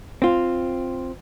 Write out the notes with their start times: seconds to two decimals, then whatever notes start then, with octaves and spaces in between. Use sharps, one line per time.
0.22 C4 F4